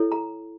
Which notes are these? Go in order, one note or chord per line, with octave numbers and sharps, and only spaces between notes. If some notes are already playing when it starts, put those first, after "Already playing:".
Already playing: E4 A4 C#5
A#5